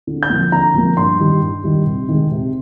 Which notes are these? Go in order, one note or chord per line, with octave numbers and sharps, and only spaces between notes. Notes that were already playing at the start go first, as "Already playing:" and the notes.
D3
G6
F3 A#3
D3 A#5
F3 A#3
G2 C6
D#3 G3
G2
D#3 G3
C3
D#3 G#3
C3